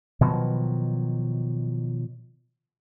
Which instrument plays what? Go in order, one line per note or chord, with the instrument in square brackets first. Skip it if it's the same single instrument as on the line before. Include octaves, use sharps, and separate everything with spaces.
[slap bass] B2 D#3 F3 F#3